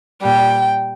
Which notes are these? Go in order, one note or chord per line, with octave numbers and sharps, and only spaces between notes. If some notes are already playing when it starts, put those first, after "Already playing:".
A#2 G3 G5